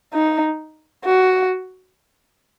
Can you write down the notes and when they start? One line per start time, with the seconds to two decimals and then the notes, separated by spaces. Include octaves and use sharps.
0.14 D#4
1.05 F#4